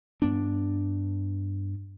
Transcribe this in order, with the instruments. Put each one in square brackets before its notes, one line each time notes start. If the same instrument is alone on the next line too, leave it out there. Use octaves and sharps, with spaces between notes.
[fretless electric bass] G2 B3 D4